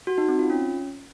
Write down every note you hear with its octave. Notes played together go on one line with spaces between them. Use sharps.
F#4
D#4
C4
F4
C#4